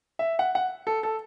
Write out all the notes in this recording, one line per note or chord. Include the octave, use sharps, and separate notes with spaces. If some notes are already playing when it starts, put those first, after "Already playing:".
E5
F#5
F#5
A4
A4